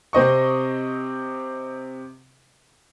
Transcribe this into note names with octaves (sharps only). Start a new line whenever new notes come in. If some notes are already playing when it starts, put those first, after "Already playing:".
C3 C4 D#5 C#6